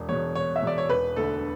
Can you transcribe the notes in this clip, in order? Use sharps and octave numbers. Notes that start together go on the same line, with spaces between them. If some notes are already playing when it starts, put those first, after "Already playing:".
Already playing: E1
E2 B2 C#5
E1 C#5
E5
E2 B2 D5
C#5
E1 B4
D2 D3 A4